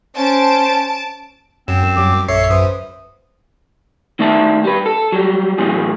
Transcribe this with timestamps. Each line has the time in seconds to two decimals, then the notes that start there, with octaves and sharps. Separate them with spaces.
0.16 C#4 C5 A5 D7
1.68 F#2 C4 E7
1.96 F#3 G3 D6
2.28 A#1 F#2 A4 C#5 E5 C#6 C7
2.50 F#2 B4 C5 D#6
4.19 D#3 A3 D5 E5 A5
4.64 G3 B4
4.86 A4
5.12 F#3 G3
5.58 A2 E3 F#3 G#4